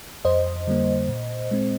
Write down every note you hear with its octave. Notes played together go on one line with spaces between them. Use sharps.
F2 C5 D#5
D3 G3 A#3
A#2
G#3 C4